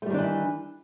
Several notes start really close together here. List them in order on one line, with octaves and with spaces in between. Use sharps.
A3 G3 D#3 D4 E3